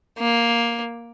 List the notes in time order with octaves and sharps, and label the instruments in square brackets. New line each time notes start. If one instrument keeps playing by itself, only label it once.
[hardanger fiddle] A#3